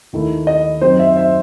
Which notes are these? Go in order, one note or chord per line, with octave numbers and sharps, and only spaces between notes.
D#2 D#3 A3 E4
D#5
F#2 F#3 C4 D#4 C5
E5
E5